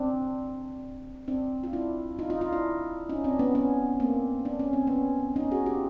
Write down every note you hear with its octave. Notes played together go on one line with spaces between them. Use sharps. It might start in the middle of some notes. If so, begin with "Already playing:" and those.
Already playing: C4 D4
C4 D4
F4
D4 E4
D#4 F4
D#4 F4
D#4 F4
D4 E4
C#4 D#4
C4 D4
B3 C#4
B3 C#4
A#3 C4
D4
C#4
C4
B3 C#4
C#4 D#4
F#4 G#4
F4 G4